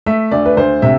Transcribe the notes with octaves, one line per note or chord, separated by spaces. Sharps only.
A3 E5
D2 D5
B4
D2 C5
C3 E5